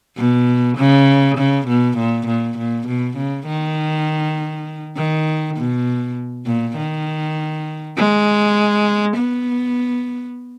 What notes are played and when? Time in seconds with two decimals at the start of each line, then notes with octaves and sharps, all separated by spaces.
0.17 B2
0.78 C#3
1.38 C#3
1.67 B2
1.97 A#2
2.27 A#2
2.58 A#2
2.87 B2
3.17 C#3
3.47 D#3
4.97 D#3
5.57 B2
6.46 A#2
6.77 D#3
7.97 G#3
9.17 B3